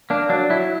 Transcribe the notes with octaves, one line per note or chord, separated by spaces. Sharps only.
A#3 D4
F#3 D4
F#3 E4